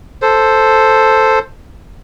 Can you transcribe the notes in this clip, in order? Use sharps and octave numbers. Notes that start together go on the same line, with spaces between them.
A4 C5